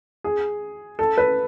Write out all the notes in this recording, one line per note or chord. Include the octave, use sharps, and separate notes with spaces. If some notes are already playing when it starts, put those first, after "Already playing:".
G#4
A4
B4